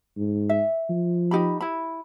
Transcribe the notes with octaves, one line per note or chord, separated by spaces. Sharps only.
G#2
E5
F3
D#4 G4 B5
E4 B5